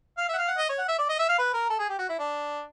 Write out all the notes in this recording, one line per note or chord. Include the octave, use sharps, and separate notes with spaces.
F5
E5 F#5
F5
F#5
D#5
C#5
F#5
E5
D5
D#5
E5
F5
B4
A#4
A4
G#4
G4
F#4
E4
D4